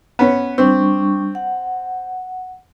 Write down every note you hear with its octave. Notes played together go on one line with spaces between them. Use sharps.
B3 C#4
G3 C4 D4 C#6
F#5